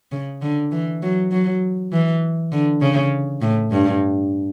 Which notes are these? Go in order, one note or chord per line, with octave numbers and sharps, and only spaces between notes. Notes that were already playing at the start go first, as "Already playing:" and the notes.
C#3
D3
E3
F#3
F#3
E3
D3
C#3
A2
G2